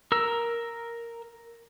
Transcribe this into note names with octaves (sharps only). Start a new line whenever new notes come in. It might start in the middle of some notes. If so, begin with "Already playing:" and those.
A#4 E6